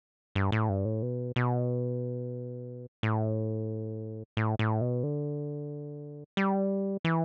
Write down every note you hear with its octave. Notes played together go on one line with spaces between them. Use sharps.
G2
A2
G2
A2
B2
B2
A2
A2
A2
B2
D3
G3
E3